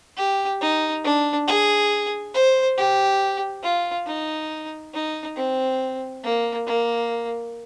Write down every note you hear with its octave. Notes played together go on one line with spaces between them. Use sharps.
G4
D#4
D4
G#4
C5
G4
F4
D#4
D#4
C4
A#3
A#3